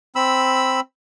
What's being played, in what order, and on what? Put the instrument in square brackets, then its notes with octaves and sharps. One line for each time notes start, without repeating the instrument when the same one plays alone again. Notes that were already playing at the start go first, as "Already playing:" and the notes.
[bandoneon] C4 B5 E6